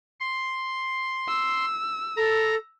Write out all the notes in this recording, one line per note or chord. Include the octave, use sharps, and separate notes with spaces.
C6
E6
A4 A#5